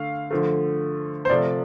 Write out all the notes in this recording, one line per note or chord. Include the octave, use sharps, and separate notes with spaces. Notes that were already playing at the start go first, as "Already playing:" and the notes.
Already playing: D3 A3 F5
D3 F3 A3
C5
C3 F3 A3 D5